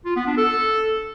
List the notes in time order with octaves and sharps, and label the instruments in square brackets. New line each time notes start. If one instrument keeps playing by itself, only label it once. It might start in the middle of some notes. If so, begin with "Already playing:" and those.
[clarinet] F4
B3
D4
A4